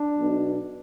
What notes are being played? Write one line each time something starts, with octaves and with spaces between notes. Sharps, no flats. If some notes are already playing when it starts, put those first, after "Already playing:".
Already playing: D4
B1 B2